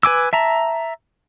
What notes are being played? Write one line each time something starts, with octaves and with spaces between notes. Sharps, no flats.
B4 G#5 D6 E6
E5 A5 A#5